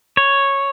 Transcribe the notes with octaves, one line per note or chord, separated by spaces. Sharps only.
C#5